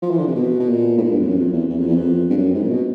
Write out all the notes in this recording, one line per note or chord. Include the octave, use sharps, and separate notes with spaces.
F3
E3
D3
C3
B2
B2
A#2
A2
A#2
G2
F2
F#2
F2
E2
E2
F2
E2
F2
G2
F#2
G#2
A#2
B2